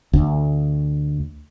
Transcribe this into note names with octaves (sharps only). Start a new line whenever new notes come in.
D2